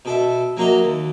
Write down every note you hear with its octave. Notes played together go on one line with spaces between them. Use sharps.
B2 A4 E5
F#3 A#3 F#4 D#5 E5
D#2